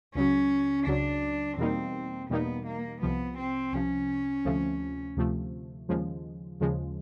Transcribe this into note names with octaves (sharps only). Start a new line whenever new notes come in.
C#2 C#3 F#3 C#4
C#2 C#3 F#3 D4
E2 B2 G3 A#3 C4 D#4
E2 B2 G3 A#3 B3 D#4
A#3
C2 C3 F3 B3
C4
C2 C3 F3 C#4
D2 C3 F3 A3
D2 C3 F3 A3
D#2 C#3 F3 G#3
D#2 C#3 F3 G#3